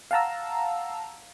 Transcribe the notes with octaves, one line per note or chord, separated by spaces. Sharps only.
F5 F#5 A5 A#5 E6